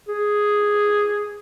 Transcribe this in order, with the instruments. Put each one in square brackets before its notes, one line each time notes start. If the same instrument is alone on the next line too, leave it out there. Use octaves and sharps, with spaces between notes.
[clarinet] G#4